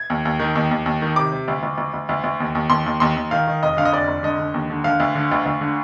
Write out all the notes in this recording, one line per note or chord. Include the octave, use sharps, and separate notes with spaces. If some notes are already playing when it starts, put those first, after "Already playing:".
Already playing: G#6
D#2
D#2
D#3
D#2
D#2
D#2
D#3
C3 D6
C3
D2
D2
D2
D2
D2
D2
D#2
D#2
D#2 C6
D#2
D#2 C6
D#2
D#3 F5
D#3
F1 D#5
D3 F5
D#5
F1 D5
F1
D3 D#5
D3
D#2
D3
D3 F5
D2
D3
D2
D2
D3